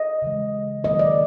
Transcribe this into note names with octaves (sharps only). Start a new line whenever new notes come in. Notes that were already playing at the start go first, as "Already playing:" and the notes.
Already playing: D#5
C#3 E3 G#3
D#3 F#3 A#3 D#5
D5